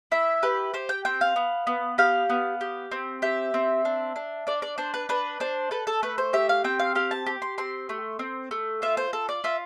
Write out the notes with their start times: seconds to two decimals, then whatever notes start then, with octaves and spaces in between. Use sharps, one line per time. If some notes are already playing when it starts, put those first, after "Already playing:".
0.12 E4 E5
0.43 G4 B4
0.74 G4 C5
0.89 G5
1.05 C4 G5
1.21 F5
1.36 B3
1.67 B3
1.98 G4 F5
2.29 B3
2.61 G4
2.91 C4
3.22 G4 E5
3.54 C4
3.85 D4
4.16 D4
4.47 D4 D5
4.62 D5
4.78 D4 C5
4.94 B4
5.09 D4 B4
5.40 D4 C5
5.71 A4 B4
5.87 A4
6.03 A3 B4
6.18 C5
6.33 G4 E5
6.49 F5
6.64 C4 G5
6.79 F5
6.95 G4 F5
7.11 A5
7.26 G4
7.42 C6
7.58 C4 C6
7.89 A3
8.19 C4
8.51 A3
8.82 F4 E5
8.97 C5
9.13 A4
9.29 D5
9.44 F4 E5